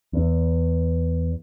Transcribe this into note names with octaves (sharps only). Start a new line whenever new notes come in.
E2